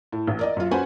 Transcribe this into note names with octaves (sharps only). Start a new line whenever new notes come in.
A2
A1
A#4 D5 D#5
F#2 F4
C#4 F#4 B4 C5 F#5 G#5